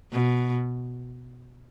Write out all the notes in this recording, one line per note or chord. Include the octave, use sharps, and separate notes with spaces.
B2